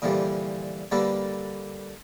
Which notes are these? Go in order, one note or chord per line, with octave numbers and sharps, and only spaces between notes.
A#2 D3 E3 F3 G3
D3 G3 A#3 A4 B4